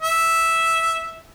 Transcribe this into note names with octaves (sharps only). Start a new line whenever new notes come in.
E5